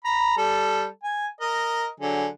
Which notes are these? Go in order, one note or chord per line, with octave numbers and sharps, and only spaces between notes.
A#5 B5
G3 A4
G#5
A#4 D#5
D3 F#3 G#4